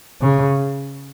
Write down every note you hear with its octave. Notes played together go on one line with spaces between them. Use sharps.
C#3